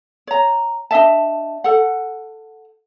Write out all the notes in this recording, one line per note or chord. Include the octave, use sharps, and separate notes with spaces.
C#5 A#5
D4 D#5 E5 A5
A4 F#5